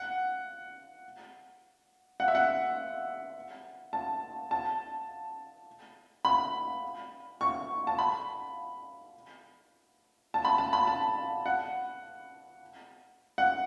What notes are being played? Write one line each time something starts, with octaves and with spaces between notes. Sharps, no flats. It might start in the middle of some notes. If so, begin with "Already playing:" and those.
Already playing: F#5
F#5
E5
F#5
A5
A5
B5
C#6
A5
B5
A5
B5
A5
B5
A5
F#5
F#5